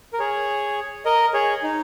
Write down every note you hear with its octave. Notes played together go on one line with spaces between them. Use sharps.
A#4
G#4 C#5
A#4 D#5
G#4 C#5
D#4